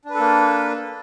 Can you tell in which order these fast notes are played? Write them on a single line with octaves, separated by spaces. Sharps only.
D4 B4 A4 A#3